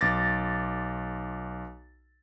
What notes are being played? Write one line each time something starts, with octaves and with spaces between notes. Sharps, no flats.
B1 D6 A6 A#6